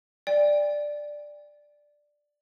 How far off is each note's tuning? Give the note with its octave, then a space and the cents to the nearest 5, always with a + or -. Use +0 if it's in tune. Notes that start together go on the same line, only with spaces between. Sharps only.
D5 +5 G5 +35